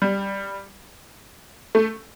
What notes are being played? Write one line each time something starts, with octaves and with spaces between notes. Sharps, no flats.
G3
A3